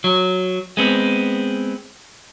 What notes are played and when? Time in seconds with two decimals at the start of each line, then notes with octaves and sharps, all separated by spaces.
0.04 F#3
0.77 G#3 B3 C4